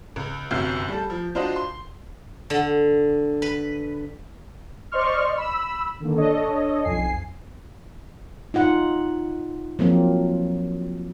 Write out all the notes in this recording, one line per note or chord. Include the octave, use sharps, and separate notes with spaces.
C#2
G1 C2 F#2 G6 C7
G3 A4
F3
D4 F4 F#4 C5 D#5
C6
D3
B4
C5 D5 D#5 C6 C#6 F6
B5 E6
D3 D#3 A#3
D4 A4 C#5 D#5
B1 F2 G#5 C7
D#4 F4 F#5
F3 F#3 A#3 C4